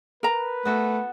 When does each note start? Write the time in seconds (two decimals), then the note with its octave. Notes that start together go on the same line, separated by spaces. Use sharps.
0.23 A#4 B4 A#5
0.65 A3 B3 F#4 A4